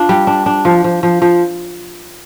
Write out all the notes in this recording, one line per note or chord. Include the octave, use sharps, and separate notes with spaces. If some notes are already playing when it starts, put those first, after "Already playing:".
Already playing: D4 F4
G3
D4
D4
F3
F3
F3
F3